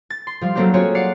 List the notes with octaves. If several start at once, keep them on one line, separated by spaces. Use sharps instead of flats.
A6
C6
F3 G3 F5
F#3 A3 A#3 C4 D4 G4
C4 C#4 F4 F#4 G#4 C#5
D5 F5 F#5 C7 C#7